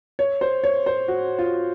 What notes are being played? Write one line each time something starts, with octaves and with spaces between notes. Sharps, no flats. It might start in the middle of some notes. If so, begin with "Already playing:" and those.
C#5
C5
C#5
C5
F#4
F4